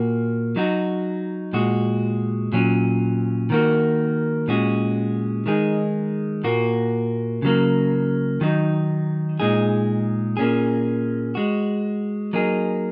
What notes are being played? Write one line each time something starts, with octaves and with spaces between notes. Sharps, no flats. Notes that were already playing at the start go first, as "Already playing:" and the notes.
Already playing: A#2 A#3 F#4
F#3 D#4 F#4
A#2 G#3 F#4
A#2 F#3 C#4
D#3 A#3 F#4
A#2 G#3 C#4 F#4
D#3 G#3 D#4 G#4
A#2 A#3 F#4
C#3 F#3 A#3
D#3 F#3 D#4
A#2 G#3 D#4 G#4
A#2 A#3 C#4 G#4
G#3 F#4
F#3 A#3 D#4 G#4